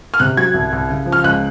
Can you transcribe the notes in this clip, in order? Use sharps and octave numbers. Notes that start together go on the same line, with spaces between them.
F6
C3 F#6
F#3 G#6
C2
C2
C#3
F3
F6
C#2 F#6